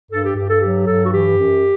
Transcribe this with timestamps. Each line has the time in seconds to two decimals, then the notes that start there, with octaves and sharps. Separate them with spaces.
0.10 G2 A4
0.23 G4
0.36 G2 G4
0.49 A4
0.61 F#3 G4
0.86 G2 A4
1.05 F#4
1.11 E3 G4
1.37 F#2